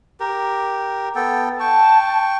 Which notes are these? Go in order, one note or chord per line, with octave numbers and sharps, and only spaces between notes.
G4 A#4
B3 A4 G5
G5 A5 C#6